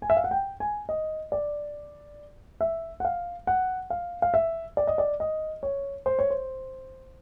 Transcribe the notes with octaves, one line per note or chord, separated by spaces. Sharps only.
G#5
E5
F5
F#5
G5
G#5
D#5
D5
E5
F#5
F5
F#5
F5
F5
E5
D5
D#5
D5
D#5
C#5
C5
C#5
C5